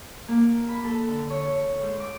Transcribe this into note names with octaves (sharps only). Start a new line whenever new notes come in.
A#3
B5
A4
D3
C#5
G#2
D6